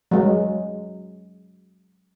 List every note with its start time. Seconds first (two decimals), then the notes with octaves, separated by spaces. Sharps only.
0.11 F#3 G#3